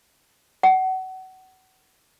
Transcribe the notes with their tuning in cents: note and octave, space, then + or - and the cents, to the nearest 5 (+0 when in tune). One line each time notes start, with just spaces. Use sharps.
F#5 +30